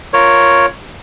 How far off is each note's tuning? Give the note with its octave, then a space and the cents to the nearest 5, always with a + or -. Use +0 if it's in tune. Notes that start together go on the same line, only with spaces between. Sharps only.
F4 +0 A#4 +0 C#5 +0